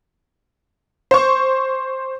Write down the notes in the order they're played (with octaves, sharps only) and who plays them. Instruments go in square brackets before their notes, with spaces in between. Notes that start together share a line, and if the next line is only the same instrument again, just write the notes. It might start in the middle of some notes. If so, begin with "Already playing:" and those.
[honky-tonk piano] C5 C#6